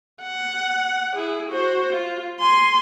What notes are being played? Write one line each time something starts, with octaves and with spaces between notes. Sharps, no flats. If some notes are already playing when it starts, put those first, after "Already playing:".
F#5
E4 G#4
F#4 C5
F4
G#5 C6